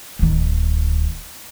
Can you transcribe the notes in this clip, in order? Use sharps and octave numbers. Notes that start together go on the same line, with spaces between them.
D1 D#3